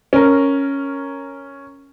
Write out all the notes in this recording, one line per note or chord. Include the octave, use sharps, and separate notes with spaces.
C#4 A#4